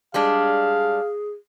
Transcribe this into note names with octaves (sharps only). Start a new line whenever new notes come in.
G3 G#3 D4 G#4 F5